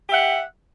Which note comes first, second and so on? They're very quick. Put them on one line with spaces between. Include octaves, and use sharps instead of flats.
G4 E5 F#5